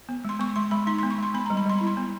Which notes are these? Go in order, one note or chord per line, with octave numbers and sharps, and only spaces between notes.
B3
G#3 C6
B3 C#6
G#3 C6
G#3 B5
D#4 C6
C6
B3
C#6
G#3 C6
B3 B5
A#5
G3
B5
G3 C6
E4 B5
C6
B3